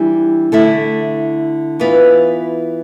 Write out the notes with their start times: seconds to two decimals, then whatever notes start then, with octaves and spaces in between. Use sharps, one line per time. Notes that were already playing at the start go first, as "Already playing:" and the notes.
Already playing: E3 G3 D4
0.52 D3 A3 E4
1.79 E3 B3 F4 B4